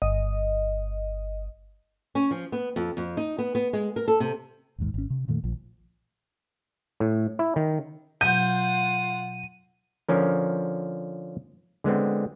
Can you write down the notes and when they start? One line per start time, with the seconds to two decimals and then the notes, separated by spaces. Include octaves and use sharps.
0.02 G1 D#5
2.15 C#4
2.31 F3
2.52 B3
2.76 F2
2.97 F2
3.17 D#4
3.39 B3
3.55 B3
3.73 G#3
3.96 A#4
4.08 A4
4.20 C3
4.78 A1 D#2 G#2
4.94 G#1 C#4
5.10 C3
5.28 F2 A#2 D#3 A3
5.44 A#1 F3
7.00 A2
7.39 E4
7.56 D#3
8.21 B2 F#3 F4 F#5 G6 D#7
10.09 D3 F3 C#4 A#4
11.84 D3 G#3 B3 C4